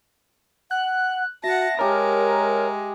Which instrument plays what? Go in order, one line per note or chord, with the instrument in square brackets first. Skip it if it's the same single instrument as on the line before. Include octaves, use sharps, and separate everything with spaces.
[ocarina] F#5 [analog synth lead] F#6
[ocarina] F#4 [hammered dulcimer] E5 [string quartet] F#5 A5 [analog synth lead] A#6
[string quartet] G#3 [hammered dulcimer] G4 A5 [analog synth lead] A#4 [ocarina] C#5